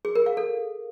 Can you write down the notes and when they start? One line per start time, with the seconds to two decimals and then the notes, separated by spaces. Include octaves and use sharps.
0.05 G#4
0.15 A#4
0.26 F5
0.37 A4